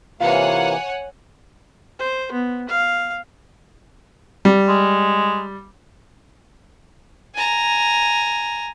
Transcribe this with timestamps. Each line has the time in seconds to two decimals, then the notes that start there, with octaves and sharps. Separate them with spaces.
0.21 C3 E3 A#3 F4 C#5 F#5 G#5
1.99 C5
2.32 B3
2.69 F5
4.45 G3
4.68 G#3
7.35 G#5 A#5